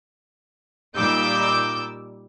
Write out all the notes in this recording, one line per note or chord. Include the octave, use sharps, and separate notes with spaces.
A#2 G3 D#4 D6 E6 G6